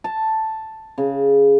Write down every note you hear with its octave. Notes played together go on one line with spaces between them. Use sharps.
A5
C#3